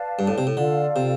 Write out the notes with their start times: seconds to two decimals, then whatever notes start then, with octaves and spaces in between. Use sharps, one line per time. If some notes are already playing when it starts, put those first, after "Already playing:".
Already playing: B4 D5 F5 A5
0.19 G2
0.28 A2
0.38 C3
0.47 A2
0.56 D3 F4 A4 D5 F5
0.96 C3